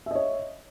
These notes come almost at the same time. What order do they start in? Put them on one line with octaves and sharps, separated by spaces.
E5 D#5 C#5